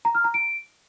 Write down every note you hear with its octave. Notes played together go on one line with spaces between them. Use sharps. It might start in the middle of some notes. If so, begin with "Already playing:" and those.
A#5
F6
A#5
D7